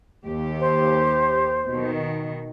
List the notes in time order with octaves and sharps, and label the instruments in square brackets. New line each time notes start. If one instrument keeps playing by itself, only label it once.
[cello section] D#2 G4
[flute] C5
[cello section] B2 D#3